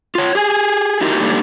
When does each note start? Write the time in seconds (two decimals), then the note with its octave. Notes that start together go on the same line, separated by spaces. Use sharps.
0.15 F4 C#5
0.35 G4 G#4 G#5
1.01 D#4 E4 F#4 G4 A#4
1.19 G3 A#3 D4 D#4 G4 A4